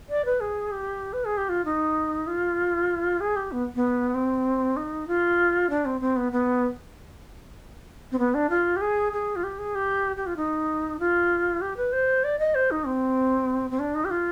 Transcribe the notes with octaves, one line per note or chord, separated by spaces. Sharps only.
D5
B4
G#4
G4
B4
G#4
G4
F4
D#4
F4
G#4
G4
B3
B3
C4
D#4
F4
D4
C4
C4
B3
B3
C4
B3
D4
F4
G4
G#4
G#4
F4
G4
G#4
G4
G4
F4
D#4
F4
G4
B4
C5
D5
D#5
C5
D#4
C4
C4
D4
D#4
G4
F4